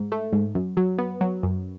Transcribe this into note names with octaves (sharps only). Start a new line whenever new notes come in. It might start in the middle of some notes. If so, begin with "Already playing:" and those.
Already playing: G#2
A3
G#2
F#2
F#3
B3
F#3
F#2